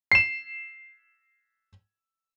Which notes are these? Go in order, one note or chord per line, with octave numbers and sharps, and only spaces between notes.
C7 E7